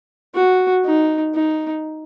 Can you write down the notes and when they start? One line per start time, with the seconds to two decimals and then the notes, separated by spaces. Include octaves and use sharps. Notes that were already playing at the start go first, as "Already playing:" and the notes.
0.35 F#4
0.85 D#4
1.35 D#4